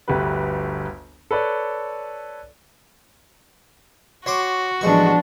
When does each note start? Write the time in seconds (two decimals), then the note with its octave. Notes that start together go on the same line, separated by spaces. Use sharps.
0.08 G1 D2 G3 G4 B4
1.31 A4 B4 C#5 D5
4.26 F#4 C#5 C6 D6
4.81 A1 F3 G#3 B3 D4 C#6